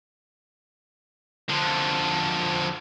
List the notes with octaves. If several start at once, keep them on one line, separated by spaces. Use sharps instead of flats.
D3 F3